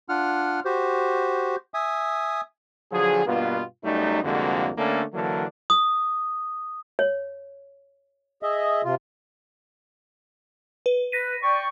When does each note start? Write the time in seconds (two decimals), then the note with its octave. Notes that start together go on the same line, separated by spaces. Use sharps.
0.09 D4 F4 F#5 F6
0.65 F#4 G4 C5
1.74 E5 G#5 D#6
2.92 D3 F3 F#3 G#4
3.26 G2 B2 A#3 B3 F4
3.84 F#2 G3 A3 D#4
4.24 C2 F2 D3 G#3 A#3 F#4
4.78 D3 A3 A#3 C#4 D4
5.14 D3 E3 F#3 A#3 D4
5.70 D#6
6.99 C#5
8.43 G#4 D#5 E5
8.85 C3 F4
10.86 B4
11.12 B4 A#6 B6 D#7
11.42 D5 G5 C#6